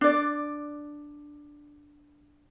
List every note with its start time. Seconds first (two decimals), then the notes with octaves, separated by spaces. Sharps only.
0.01 D4 D5